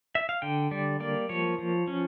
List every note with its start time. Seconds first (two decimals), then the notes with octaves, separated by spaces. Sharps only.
0.15 E5
0.29 F5
0.42 D3 G5
0.71 G3 D5
1.00 A#3 D5
1.29 F3 C#5
1.58 F3
1.88 C#4